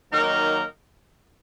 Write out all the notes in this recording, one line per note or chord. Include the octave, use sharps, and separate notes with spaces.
D#3 F#3 A#3 D#4 A#4